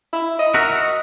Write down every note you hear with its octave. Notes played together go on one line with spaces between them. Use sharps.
E4
D#5
F#4 A#4 E5
F#4